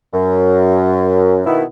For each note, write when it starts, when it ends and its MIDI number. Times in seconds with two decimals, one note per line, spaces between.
0.13 1.41 42
1.46 1.63 47
1.46 1.63 51
1.46 1.63 58
1.46 1.63 59
1.46 1.63 64